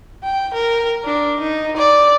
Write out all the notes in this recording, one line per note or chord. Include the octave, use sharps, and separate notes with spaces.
G5
A#4
D4
D#4
D5